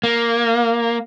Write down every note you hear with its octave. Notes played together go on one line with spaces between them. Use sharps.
A#3